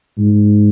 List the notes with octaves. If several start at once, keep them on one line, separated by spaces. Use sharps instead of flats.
G#2